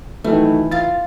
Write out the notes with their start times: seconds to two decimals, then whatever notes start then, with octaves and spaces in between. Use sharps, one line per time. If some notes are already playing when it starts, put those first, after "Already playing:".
0.24 D#3 E3 F#3 A3
0.71 F4 F5 A6